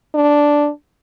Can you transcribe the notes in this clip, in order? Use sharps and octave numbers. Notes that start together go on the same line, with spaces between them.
D4